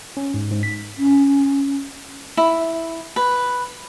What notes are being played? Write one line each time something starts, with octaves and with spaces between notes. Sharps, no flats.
C#4
G#2
G#2
B6
C#4
E4
B4